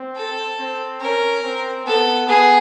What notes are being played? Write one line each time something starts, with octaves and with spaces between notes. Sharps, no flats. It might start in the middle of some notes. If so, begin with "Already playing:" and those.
Already playing: C4
A4
C4
C#4 A#4
C4
B3 A4
B3 G#4